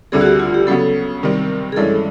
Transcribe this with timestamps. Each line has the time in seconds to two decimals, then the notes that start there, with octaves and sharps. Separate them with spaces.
0.12 D2 D3 G3 C4 G#4
0.21 F#4
0.26 G4
0.40 F4
0.54 G4
0.67 C#3 F#3 B3 A4
1.23 C3 D#3 G3 C4
1.72 G#4
1.76 G2 E3 G#3 C#4 A4